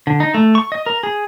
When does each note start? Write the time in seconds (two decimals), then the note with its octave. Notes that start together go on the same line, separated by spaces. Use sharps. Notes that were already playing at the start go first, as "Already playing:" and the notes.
0.07 D3
0.20 D#4
0.34 A3
0.55 C#6
0.72 D#5
0.86 A#4
1.03 G#4